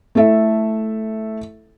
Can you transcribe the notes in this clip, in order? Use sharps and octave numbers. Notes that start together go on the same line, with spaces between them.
A3 E4 A4 E5